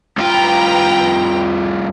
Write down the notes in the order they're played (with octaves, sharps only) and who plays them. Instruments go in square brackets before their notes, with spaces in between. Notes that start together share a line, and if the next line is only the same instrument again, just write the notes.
[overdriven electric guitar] C2 F4 [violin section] B4 G5 A#5